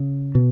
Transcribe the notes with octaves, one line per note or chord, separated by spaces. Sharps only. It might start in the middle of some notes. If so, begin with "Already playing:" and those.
Already playing: C#3
B2